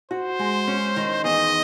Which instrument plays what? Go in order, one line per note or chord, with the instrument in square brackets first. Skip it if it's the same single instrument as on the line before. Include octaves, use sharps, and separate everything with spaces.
[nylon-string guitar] F#4 [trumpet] C5
[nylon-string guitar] G#3
C#4
D#3
[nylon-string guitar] E2 [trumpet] D#5